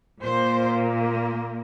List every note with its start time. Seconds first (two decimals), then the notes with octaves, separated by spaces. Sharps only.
0.21 A#2 A#3 C5